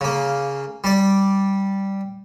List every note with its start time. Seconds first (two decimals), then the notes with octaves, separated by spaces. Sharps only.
0.01 C#3 A#3
0.84 G3 D5